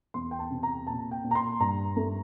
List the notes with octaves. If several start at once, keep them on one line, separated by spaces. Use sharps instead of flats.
E2 C6
G5
A5
C3
A#5
A#2 A5
G5
A#2
A#5
C6
G2 A#5
A3